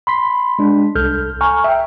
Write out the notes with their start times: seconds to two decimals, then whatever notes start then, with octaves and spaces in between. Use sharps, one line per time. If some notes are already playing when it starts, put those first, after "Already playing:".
0.07 B5 C6 B6
0.59 G#3 D4
0.95 C2 A4 F6 G6
1.41 G#5 A#5 C#6 F6
1.64 E5 G5